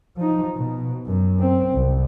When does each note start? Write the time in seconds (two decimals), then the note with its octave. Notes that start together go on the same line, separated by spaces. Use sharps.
0.17 F3 D#4
0.55 B2
1.06 F#2
1.40 C4
1.74 C2